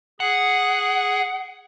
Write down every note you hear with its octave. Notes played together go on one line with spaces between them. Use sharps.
G#4 F#5